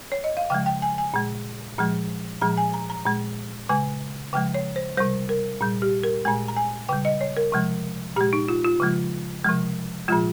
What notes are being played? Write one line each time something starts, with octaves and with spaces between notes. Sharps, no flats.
C#5
D#5
F5
C#3 F3 G#3 G5
G5
G#5
G#5
A#2 G#3
A#2 F3 G#3
A#2 F3 G#3 A#5
G#5
A#5
A#5
A#2 G#3
C#3 G#3 G#5
C#3 F3 G#3 G5
C#5
C5
C3 G3 C5
A#4
A#2 G3
G4
A#4
A#2 G#3 G#5
A#5
G#5
C#3 G3 G5
D#5
C#5
A#4
C3 F3 G#3
A#2 G#3 G4
D#4
F4
F4
C#3 F3 G#3
C3 F3 G#3
A#2 F3 G#3 F4